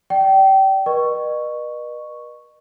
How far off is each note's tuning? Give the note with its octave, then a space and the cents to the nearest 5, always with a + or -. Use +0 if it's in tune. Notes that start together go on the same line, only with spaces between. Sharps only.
D5 +0 G5 -25
B4 -45 D#5 -40 C#6 +0